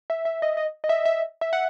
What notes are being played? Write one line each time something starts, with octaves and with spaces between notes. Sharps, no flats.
E5
E5
D#5
D#5
D#5
E5
E5
E5
F#5